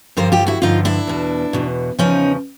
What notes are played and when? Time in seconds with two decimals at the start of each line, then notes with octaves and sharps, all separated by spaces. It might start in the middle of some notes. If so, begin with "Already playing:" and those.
0.17 G2 D3 F3 A#4 C5
0.32 F4 G4
0.47 E4 F#4
0.62 G2 D3 F3 D#4 F4
0.85 D4 E4
1.07 E2 B2
1.53 E2 B2
1.99 E2 C#3 F3 C#4 D#4